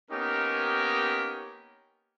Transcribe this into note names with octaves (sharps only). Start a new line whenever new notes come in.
A#3 B3 C#4 D#4 G4 A#4